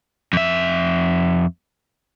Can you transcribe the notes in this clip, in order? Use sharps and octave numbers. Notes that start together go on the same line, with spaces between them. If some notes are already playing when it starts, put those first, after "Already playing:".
F2 E5